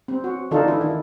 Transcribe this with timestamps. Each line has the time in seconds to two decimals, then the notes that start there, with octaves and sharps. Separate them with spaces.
0.08 C4
0.24 F#4
0.51 D3 E3 D4 D#4 F4 A4
0.68 E4
0.81 D#3